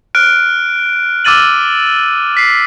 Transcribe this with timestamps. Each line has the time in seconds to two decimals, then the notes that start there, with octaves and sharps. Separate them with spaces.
0.15 F6 F#6 D7
1.25 D6 E6 F6 A6 D#7 F#7
2.37 B6 C7